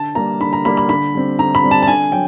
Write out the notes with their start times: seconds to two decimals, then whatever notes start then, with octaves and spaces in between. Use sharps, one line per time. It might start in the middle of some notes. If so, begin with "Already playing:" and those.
Already playing: D3 A5
0.15 G3 A#3 A#5
0.40 D3 B5
0.53 A#5
0.65 G3 A#3 B5
0.77 B5
0.89 D3 B5
1.14 G3 C4
1.39 D3 A#5
1.55 B5
1.63 G3 C4
1.71 A5
1.82 A5
1.87 D3 G#5
2.12 F#3 G5